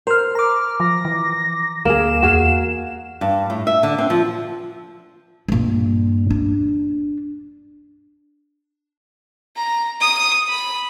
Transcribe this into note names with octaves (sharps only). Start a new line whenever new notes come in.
A#4 C5 F6
A#5 D6 F6
F3 A#6
E3
D2 A#3 G#4 E7
E2 F#4 G#4 F5
G2
A2
E5
D3
C4
F3
G2 A#2
D4
A#5
D#6
B5